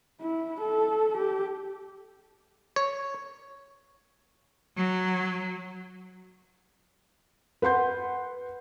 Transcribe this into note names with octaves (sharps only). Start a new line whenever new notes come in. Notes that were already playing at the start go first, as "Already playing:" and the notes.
E4
A4
G4
C#5
F#3
B4 F#5 C6 G6